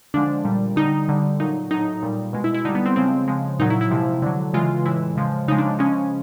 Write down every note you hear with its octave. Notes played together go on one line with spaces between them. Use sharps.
D3 F3 G#3 D4
A#2 G3
D3 G3 D#4
D3 G3
A#2 F#3 D#4
A2 F#3 D#4
A#2 G3
B2 G#3
E4
E4
D3 G3 D#4
B3
C4
C#3 F3 G#3 C4
C#3 F3 G#3
A#2 F#3 D#4
E4
E4
C3 F3 G#3
D3 F#3
C#3 E3 G#3 F4
A2 E3 G#3 E4
C#3 F3 G#3
C#3 F3 G#3 D#4
D4
C#3 F3 G#3 C#4